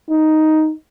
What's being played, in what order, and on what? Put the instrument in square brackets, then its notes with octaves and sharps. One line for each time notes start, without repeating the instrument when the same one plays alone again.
[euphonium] D#4